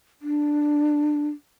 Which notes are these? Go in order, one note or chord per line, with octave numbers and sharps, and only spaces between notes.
D4